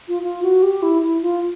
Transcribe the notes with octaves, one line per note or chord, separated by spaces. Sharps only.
F4
F4
F#4
G4
E4
E4
F4